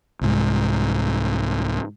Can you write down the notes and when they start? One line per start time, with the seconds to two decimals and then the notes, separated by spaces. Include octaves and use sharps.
0.21 C2 G#2